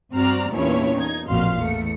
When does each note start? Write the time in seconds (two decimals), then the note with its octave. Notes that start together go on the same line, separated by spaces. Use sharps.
0.14 G2 C4 F#4 D5 A#5 F6
0.53 E2 G2 A#2 C#4 E4 C#5
0.97 D#4 G#6
1.28 A1 F2 A#2 F#4 F5 C6
1.59 E2 A3 C#7